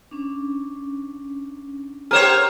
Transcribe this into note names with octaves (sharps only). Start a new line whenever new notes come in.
C#4 D4
G4 A#4 C5 C#5 F#5 G5